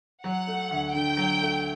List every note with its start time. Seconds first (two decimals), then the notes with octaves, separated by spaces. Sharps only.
0.24 F#3 F#5
0.47 A3
0.71 D2
0.94 D3 G5
1.17 F#3
1.42 A3